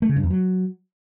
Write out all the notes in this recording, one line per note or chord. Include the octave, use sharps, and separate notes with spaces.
A3
C#3
G2
E2
F#3